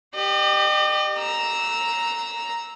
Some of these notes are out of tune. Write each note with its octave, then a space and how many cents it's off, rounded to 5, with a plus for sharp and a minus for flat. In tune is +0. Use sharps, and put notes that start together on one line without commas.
G4 +0 D#5 -40
A#5 +0 E6 -10